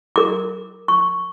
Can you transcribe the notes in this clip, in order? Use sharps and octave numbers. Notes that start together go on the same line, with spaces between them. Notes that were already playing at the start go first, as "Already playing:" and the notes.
A#4 D6
C#6